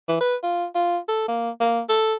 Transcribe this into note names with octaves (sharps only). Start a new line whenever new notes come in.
E3
B4
F4
F4
A4
A#3
A#3
A4